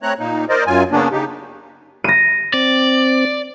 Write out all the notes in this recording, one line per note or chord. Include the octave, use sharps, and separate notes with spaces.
A3 C4 C#5 A#5 F#6
A#2 A#3 D#4
A#4 C5 D5 D#5
F#2 F#3 F4 G#5
C#3 A#3 B3 C#4 D4
C#3 D#4 G4
A#6 D#7
C4 D5